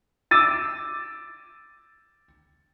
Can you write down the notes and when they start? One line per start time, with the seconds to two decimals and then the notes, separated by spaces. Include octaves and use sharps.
0.31 D6 E6 A6 D#7